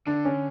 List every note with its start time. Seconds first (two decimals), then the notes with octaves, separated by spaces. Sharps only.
0.07 D3 D4
0.25 C#4